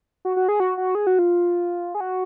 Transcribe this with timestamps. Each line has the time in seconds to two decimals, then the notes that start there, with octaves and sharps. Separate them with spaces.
0.25 F#4
0.37 F#4
0.48 G#4
0.60 F#4
0.78 F#4
0.95 G#4
1.07 F#4
1.19 F4
1.95 G#4
2.00 F#4